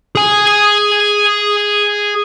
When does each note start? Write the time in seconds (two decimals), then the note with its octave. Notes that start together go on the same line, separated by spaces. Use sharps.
0.15 G#4 G#5